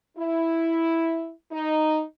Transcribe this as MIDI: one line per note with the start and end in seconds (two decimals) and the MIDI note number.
0.18 1.31 64
1.52 2.02 63